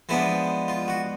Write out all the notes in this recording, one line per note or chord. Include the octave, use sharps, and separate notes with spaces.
F3 G#3 B3 D4 E4
F4
F#4